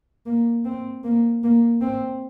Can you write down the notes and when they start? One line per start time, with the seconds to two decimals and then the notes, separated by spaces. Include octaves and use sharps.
0.26 A#3
0.65 C4
1.04 A#3
1.44 A#3
1.81 C4